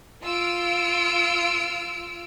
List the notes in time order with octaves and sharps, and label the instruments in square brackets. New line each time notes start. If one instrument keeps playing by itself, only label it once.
[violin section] F4 E6 F6 D7